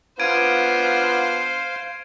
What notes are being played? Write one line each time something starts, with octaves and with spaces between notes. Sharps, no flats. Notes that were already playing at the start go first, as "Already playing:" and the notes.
B3 D4 F4 C5 F5 G#6 D7 D#7